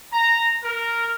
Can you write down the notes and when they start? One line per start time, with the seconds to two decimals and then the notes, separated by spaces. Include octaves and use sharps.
0.13 A#5
0.64 A#4